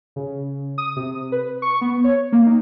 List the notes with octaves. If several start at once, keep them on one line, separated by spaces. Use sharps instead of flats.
C#3
D#6
C3
B4
C#6
B3
C#5
A#3
D#4